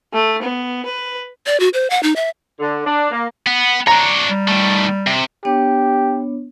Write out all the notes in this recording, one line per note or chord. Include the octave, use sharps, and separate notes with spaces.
A3
B3
B4
D5
F#4
C5
F#5
D#4
E5
D3
D4
A#3
B3
D4 C#5 A#5
G3
D#3 A3
C3
B3 D4 G4 C#5